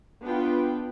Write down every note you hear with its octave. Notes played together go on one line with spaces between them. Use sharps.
B3 D4 F4 B4 G5